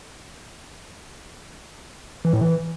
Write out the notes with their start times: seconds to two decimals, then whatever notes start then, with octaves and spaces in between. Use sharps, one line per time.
2.25 E3
2.33 A2
2.41 E3